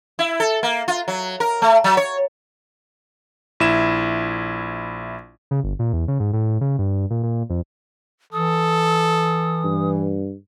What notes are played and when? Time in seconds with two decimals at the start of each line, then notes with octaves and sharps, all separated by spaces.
0.19 E4
0.40 A4
0.63 A#3
0.88 F4
1.08 F#3
1.40 A#4
1.62 A3
1.84 F#3
1.97 C#5
3.60 A#1 E4 E7
5.51 C#3
5.64 G1
5.79 A#2
5.93 E2
6.08 C#3
6.20 G#2
6.33 A2
6.61 C#3
6.79 G2
7.10 A#2
7.23 A#2
7.50 F2
8.33 E3 A4 D#6
9.64 G2